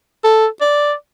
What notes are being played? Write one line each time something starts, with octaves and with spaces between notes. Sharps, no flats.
A4
D5